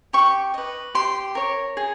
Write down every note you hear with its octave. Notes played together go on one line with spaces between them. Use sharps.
G4 C#6
B4 D#5
G4 C6
A#4 C#5
G#4